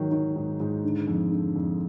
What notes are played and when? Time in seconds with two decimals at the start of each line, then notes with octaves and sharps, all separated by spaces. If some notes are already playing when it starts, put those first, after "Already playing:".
Already playing: G#2 D#3 F#3
0.11 D#3
0.36 G#2
0.60 G#2
0.84 D3
1.07 F2
1.32 D3
1.56 F2